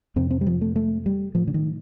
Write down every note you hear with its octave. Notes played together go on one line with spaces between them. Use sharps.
F2 C3 C4
C4
G3
F3
A3
A3
G3
A2 F3
D3
D#3